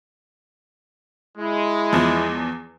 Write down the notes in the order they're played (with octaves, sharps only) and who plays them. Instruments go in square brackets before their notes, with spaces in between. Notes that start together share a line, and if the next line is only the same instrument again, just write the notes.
[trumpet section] G#3 [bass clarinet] E4
[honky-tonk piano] E2 F3